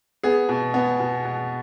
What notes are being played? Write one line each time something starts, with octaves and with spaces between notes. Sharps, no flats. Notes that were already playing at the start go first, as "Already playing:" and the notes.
B3 G#4
B2
B3
B2
B2